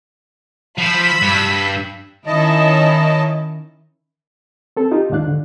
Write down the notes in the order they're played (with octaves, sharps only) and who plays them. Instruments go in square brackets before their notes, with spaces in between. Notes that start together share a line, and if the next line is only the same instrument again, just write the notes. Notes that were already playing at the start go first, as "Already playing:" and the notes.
[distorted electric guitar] F3 C5 [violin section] B5 E6 B6
[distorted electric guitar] G2
[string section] D#3 C#4 E4 [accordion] D#5 A5
[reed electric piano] C4 A4
D#4 F4 G4
D#2 G#2 D#3 D4 F5 F#6
D3